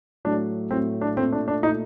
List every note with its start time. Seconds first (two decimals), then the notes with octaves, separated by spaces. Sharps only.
0.25 A2 F#3 A3 D4
0.71 A2 F#3 A3 C4
1.01 D4
1.17 A#2 A3 C4
1.32 D4
1.48 D4
1.63 A#2 D#4
1.67 A3